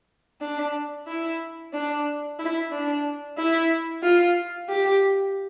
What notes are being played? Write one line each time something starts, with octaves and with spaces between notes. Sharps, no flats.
D4
E4
D4
E4
D4
E4
F4
G4